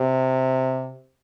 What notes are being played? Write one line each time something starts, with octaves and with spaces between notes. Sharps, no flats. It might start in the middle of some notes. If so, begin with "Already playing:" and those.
Already playing: C3